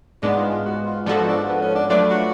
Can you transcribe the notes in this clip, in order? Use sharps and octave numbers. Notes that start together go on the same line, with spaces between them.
G#2 G#3 B3 D4
F4
F4
F#4
F4
G#2 F3 B3 D4 F#4 A4
D4
B3
C#4
D4
F#3 A3 D4 F4 B4 D5
F#4